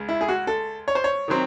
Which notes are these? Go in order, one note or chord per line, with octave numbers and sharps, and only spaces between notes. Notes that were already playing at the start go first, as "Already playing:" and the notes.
Already playing: C#2 C#3 G#3
E4
G#4
F#4
A4
C#5
C5
C#5
D#3 F#3 C4